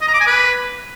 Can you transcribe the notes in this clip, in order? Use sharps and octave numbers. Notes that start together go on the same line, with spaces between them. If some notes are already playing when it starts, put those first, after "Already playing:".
D#5
A#5
D6
G#5
B4